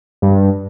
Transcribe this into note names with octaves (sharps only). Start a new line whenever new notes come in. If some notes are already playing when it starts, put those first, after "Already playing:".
G2